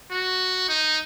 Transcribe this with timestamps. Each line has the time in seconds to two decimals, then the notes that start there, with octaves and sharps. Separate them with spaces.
0.11 F#4
0.69 D#4